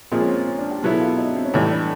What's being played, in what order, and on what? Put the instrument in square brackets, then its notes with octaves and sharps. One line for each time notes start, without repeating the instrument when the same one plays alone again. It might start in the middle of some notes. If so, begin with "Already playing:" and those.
[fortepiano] A#2 F3 G#3 [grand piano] C4
[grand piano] C#4
C4
C#4
D4
G4
[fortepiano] B2 F#3 B3 E4 [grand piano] G#4
[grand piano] A4
F4
E4
D#4
D4
C4
C#4
[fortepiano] A2 E3 G3 [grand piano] D#4
[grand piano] D4